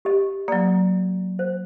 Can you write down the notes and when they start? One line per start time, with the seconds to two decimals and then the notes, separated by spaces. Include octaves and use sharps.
0.05 G4 D#5
0.48 F#3 A#3 D5
1.39 C5